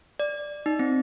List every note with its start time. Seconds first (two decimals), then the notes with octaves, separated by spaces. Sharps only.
0.19 D5
0.66 D#4
0.79 C4